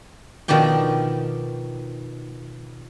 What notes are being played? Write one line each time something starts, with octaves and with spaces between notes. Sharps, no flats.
B2 D#3 F3 D5 G5